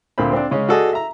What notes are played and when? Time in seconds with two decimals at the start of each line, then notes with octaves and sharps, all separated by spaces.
0.18 D2 A#2 C4 C5 B5
0.33 C4 D4
0.51 C#3 G#3 C#4
0.69 F#4 G#4 A4 D5 D#5 G#5
0.93 E5 A#5